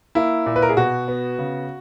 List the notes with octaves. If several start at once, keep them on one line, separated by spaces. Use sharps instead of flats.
A#3 E4
A#2
B4
A#4
G#4
B2 F#4
B3
C#3